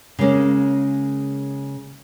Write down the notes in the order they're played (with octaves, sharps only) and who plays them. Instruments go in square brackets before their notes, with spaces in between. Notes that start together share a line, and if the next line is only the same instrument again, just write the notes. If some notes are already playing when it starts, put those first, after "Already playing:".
[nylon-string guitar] C#3 G#3 A#3 C#4